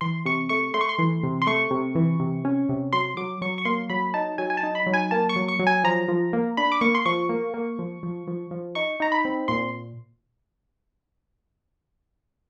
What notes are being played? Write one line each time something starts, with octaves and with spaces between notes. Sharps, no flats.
E3 C6
C3 C#6
A3 C#6
A3 C6
C#6
C6
E3
C3
C6
A3 C#6
C3
E3
C3
C#4
C3
F#3 C6
F#3 D6
F#3 C#6
C#6
A#3 C6
F#3 B5
D#4 A5
F#3 G#5
G#5
A5
D#4
B5
F#3
G#5
A#3 A5
C#6
F#3
C#6
F#3
G#5
F3 A#5
F3
A#3
D4 B5
D6
A#3 C#6
C6
F3 C#6
A#3
A#3
F3
F3
F3
F3
D#4 C#6
D#4 A#5
B5
C4
A#2 C6